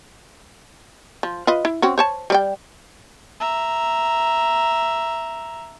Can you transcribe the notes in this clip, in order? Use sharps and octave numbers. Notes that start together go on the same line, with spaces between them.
F3
F4 B4 D#5
E4
C4 C#4 F#4
C5 C#5 A5
G3 D5 G5
E5 A#5